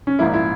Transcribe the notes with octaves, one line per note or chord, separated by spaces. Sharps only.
C#4
A#1 G#2 F3 A#3 E4
E4